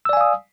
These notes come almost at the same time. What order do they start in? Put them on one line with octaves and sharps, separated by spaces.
E6 D5 G#5 F5 D#6